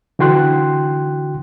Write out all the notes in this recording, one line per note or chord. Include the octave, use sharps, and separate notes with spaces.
D3 E3 F#4 G5 C6 F#6